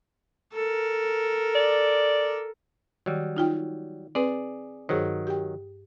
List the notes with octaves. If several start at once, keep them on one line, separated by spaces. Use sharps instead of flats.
A4 A#4
D5
D#3 F#3 G3
D#4 F4 G5
C4 G#4 B4 D5
G2 D#3 F#3 G#4 C5
G4 G5